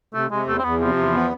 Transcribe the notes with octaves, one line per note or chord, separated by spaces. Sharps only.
C3 A3
C3 G#3
E2 A3
C4
E2 B3
C3 F3
E2
B3